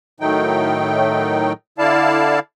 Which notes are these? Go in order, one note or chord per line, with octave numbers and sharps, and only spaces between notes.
A2 D#3 F#3 A3 D#4 G5
D3 E4 D5 F5 A5